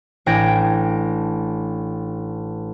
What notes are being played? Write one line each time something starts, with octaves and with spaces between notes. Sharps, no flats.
A1 D4 G5 G#6 A#6 D7